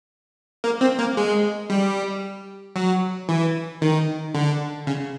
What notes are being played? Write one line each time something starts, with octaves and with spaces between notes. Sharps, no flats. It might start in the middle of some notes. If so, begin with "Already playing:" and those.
A#3
C4
A#3
G#3
G3
F#3
E3
D#3
D3
C#3